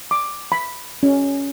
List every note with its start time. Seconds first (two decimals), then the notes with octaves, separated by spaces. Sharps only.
0.11 D6
0.52 B5
1.03 C#4